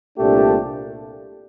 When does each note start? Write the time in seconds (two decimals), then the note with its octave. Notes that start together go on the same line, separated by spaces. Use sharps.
0.17 C2 A#2 A3 D4 G4